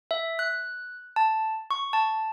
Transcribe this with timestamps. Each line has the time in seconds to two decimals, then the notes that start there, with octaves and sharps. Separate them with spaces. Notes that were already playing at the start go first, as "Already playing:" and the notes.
0.11 E5
0.39 F#6
1.16 A5
1.71 C#6
1.93 A5